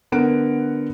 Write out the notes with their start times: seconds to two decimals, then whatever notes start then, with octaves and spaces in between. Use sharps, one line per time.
0.12 D3 B3 A#4 F#5 D7